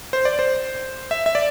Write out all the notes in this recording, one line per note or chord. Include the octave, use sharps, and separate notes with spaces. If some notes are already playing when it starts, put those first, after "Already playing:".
C5
D5
C5
E5
E5
D5